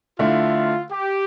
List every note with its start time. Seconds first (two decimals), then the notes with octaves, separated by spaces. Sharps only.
0.19 D3 A3 E4 F4
0.92 G4